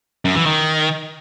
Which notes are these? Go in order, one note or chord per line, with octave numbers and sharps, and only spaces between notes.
F#2
E3
D#3